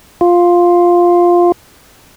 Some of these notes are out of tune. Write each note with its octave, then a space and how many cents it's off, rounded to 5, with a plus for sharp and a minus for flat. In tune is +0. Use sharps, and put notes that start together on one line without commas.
F4 +5